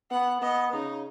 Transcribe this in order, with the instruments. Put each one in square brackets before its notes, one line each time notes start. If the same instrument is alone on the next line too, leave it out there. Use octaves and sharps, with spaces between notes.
[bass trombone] B3 [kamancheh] F#5
[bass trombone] B3 [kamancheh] D#5
[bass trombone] C#3 [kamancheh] D#4